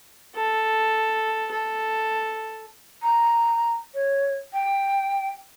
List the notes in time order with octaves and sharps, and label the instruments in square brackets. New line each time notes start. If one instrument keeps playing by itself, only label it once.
[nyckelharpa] A4
A4
[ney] A#5
C#5
G5